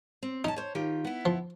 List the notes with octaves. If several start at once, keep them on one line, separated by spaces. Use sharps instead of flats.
C4
C#4 D#4 E4 A5
C5 C#5
D#3 F4 G4
B3 E4
F3